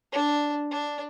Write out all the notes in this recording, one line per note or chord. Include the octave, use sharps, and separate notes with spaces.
D4
D4